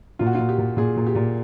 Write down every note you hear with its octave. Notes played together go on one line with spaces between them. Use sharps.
A#2 F4
F#4
A#2 F4
G4
A#2
A#2 G#4
A#2
G4
A#2